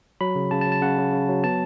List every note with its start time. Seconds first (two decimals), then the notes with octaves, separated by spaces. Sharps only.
0.21 F#3 B5
0.36 C#3
0.51 C#3 A5
0.61 A5
0.66 F#3
0.72 A5
0.82 C#3 F#5
0.98 C#3
1.13 C#3
1.29 F#3
1.44 B3 A5